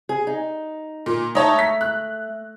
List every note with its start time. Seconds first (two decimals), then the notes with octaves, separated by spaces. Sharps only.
0.09 G#4
0.27 D#4
1.06 A#2
1.35 A3 D#4 C#5 A5
1.59 B6
1.81 F#6